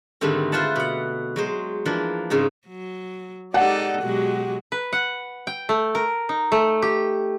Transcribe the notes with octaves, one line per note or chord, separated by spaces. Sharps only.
G#2 D3 D#3 G3 A3 C4
F4 B4 C5 E5 F#5 A5
B2 F#5
F#3 G#3 C5
E3 F3 A#3 D4
G#2 C#3 C4 D#4
F#3
G#3 D#4 G4 A4 D5 F#5
B2 F#3 G#3 F#4 G4
B4
F#5
G5
A3
A#4
D#4
A3
G4